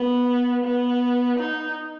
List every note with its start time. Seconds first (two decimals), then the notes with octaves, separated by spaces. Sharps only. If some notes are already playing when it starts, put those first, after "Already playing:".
Already playing: B3
0.64 B3
1.39 D#4